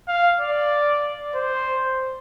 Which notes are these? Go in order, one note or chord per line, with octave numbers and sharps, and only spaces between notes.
F5
D5
C5